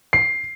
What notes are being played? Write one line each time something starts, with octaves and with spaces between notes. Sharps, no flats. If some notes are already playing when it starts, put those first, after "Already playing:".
C7